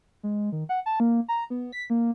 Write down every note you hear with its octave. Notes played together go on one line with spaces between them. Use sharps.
G#3
D#3
F#5
A5
A#3
A#5
B3
B6
A#3